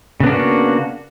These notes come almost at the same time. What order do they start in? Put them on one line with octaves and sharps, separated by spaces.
C#3 B3 D4 A#3 F#4